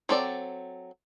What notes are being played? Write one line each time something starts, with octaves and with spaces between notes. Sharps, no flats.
F#3 C4 A4 D5